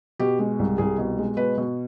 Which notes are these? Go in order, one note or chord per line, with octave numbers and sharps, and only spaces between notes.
B2 G4
G#3
C2
C2 G#4
B2
G#3
B2 B4
B2